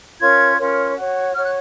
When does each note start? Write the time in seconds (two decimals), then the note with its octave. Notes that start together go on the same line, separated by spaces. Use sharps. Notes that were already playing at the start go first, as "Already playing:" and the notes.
0.20 C#4 F4 A#4 C#5 G#6
0.57 C#4 F4 A#4 C#5
0.96 F#4 C#5
1.34 F#4 F6
1.38 C#5
1.44 F#6